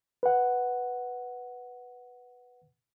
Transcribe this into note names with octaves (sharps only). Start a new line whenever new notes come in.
B4 F#5